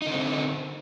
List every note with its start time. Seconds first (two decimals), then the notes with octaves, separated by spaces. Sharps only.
0.02 D#4
0.07 D3
0.11 C4